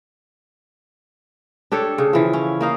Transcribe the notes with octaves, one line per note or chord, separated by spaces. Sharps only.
D4 G4 A4 C#5
C#3
E3 F3
C#4
A#3 D#4 F5